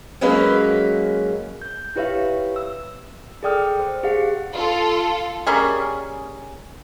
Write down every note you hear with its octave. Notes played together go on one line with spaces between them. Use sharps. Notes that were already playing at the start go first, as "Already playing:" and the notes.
F#3 G#3 A#3 C#4 B4
G6
E4 G4 B4 C#5 E5 F5
E6
G#4 A4 D5 G5 D#6 F6
C5
G4 G#4 F5 F#5
F4 A4
G3 A#3 C#4 G#4